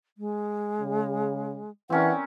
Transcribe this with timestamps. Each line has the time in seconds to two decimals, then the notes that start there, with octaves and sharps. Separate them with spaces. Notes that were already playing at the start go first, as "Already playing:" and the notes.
0.18 G#3
0.81 C#3
1.90 E3 C4 C#4 A#4 F#5